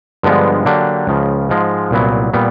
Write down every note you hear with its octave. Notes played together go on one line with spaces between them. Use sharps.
G2 D3 F3 G#3 B3
D3 F#3 A#3 D4 G4
C#2 C#3 F3
G#2 F3 G#3
C2 A#2 F#3 B3 E4
A#2 G3 B3